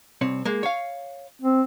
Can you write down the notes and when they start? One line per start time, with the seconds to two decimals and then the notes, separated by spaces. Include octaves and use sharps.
0.21 C2 C4 C#5
0.45 G#3 A#3
0.63 C#5 F5
1.42 C4